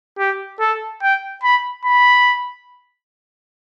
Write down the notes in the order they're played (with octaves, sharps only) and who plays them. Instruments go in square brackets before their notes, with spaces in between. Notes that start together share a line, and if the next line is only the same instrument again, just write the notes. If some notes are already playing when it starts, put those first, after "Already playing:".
[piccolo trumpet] G4
A4
G5
B5
B5